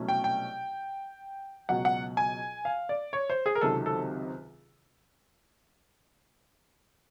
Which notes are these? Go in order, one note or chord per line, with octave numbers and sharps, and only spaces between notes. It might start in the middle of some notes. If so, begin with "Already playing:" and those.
Already playing: C2 B2 F#3 A3 C#4
G5
G5
C#2 B2 F#3 F#5
F#5
G#5
F5
D5
C#5
C5
G#4
A#4
C#2 C3 D#3 F#3 A4
A4